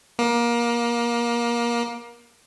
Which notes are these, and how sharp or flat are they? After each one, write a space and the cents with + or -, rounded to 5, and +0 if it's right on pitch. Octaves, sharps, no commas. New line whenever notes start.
A#3 +25